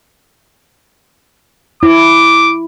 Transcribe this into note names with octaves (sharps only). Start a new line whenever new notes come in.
E4 D6